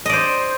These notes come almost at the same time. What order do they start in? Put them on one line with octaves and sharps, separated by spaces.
D#5 D5 C5